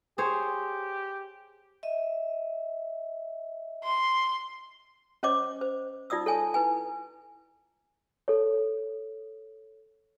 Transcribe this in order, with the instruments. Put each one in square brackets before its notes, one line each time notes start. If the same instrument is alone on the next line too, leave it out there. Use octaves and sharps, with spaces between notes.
[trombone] G4 [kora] G#4 C5 C#5
[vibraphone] D#5 E5
[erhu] C6
[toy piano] C#4 C5 C#5 D#5 D6
C5
D#4 F4 D5 D#6 E6
A4 C#5 G#5 A5 D#6
E4 B4 G#5
[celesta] A4 C#5